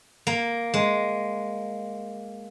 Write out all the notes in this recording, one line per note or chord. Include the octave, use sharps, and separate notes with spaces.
A#3
G#3